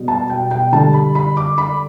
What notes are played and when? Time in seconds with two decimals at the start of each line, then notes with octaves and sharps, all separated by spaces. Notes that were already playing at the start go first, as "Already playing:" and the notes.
Already playing: B2 G3
0.08 A5
0.30 G5
0.51 G5
0.72 D3 G3 A5
0.94 B5
1.15 B5
1.37 D6
1.58 B5